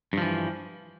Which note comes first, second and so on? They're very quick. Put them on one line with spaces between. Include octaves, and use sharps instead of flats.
G2 F3 E3